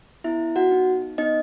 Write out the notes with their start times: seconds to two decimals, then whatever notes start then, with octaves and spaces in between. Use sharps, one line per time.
0.24 B3 E4 E5
0.56 F#4 F#5
0.71 D#4
1.18 B3 D#4 D#5